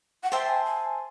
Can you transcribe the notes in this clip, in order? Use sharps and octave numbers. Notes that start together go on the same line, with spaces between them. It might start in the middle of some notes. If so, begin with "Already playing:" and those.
F#5
C5 E5 G5 A5 C6
G#5
G#5